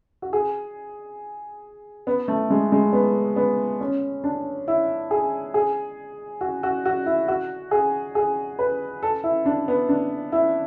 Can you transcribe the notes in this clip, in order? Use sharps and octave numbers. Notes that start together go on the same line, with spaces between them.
F#4
G#4
B3
A3
G#3
G#3
B3
B3
C#4
D4
E4
G#4
G#4
F#4
F#4
F#4
E4
F#4
G#4
G#4
B4
A4
E4
D4
B3
D4
E4